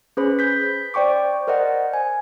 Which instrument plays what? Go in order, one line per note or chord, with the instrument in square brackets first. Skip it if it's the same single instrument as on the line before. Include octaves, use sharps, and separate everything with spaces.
[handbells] C#4 G#4 B4 C5 B5
G6 B6
C5 D5 G5 C#6 D6
A#4 C5 D5 D#5 F#5
G#5